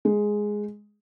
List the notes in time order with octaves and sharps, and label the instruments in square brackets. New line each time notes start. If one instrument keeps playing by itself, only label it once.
[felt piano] G#3